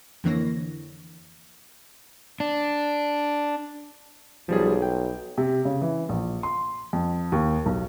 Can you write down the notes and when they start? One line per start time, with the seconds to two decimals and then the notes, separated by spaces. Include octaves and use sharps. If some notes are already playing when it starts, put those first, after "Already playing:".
0.24 F2 D3 E3 A#3 C#5 A#6
2.40 D4
4.49 B1 F3 G3 G#4
4.82 G5
5.38 C3
5.65 C#3
5.81 E3
6.09 A#1
6.43 C6
6.93 F2
7.32 D#2
7.66 B1